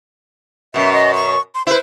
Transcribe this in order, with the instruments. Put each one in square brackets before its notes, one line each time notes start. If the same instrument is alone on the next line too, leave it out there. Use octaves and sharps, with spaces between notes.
[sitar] F#2 B2 [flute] E5
[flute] D#5
C#6
C6
[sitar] E4 B4 [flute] C5